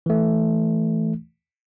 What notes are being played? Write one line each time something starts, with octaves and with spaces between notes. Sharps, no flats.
E3 A3